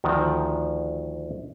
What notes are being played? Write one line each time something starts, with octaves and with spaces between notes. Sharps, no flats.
D2 D#3 F3 F#4 A4